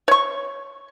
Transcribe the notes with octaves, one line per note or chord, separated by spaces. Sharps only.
C#5 C#6